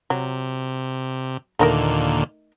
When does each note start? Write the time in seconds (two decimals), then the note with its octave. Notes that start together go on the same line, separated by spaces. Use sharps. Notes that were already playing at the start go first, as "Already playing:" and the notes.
0.10 C3 F#3
1.59 D#2 A#2 D3 A3 D#4 A#4